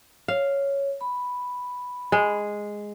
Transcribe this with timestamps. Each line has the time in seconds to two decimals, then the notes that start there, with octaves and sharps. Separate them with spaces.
0.28 C#5 F5
1.01 B5
2.12 G#3